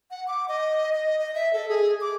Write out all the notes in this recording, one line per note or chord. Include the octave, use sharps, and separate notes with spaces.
F#5
D6
D#5
D#5
D#5
E5
A4
G#4
D6